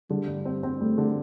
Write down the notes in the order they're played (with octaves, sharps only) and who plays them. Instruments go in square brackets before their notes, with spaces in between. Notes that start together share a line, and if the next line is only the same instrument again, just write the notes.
[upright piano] D3 [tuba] G3
[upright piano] G2
C4
C4
[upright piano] G3 [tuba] A3
[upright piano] D3